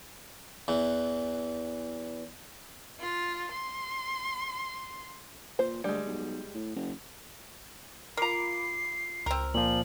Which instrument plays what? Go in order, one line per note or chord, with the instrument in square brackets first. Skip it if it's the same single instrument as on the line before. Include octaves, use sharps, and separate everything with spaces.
[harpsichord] E2 E3
[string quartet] F4
C6
[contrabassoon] A#2 [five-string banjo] C5
[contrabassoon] D2 [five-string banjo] G3 G#3
[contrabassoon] B1
A2
F#1
[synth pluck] F4 B5 D6 [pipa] A#4 A#5 [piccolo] C7
[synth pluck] C#2 [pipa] C4 A#4
[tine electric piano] A#2 F3 [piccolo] F#7